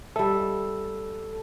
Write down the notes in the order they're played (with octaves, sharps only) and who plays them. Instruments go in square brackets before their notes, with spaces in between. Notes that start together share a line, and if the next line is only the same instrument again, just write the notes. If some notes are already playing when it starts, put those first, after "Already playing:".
[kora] G3 E5 [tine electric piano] A4